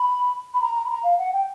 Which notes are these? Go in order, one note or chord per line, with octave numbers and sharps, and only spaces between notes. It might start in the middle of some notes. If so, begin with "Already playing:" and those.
Already playing: B5
B5
A#5
A#5
B5
A#5
F5
F#5
G5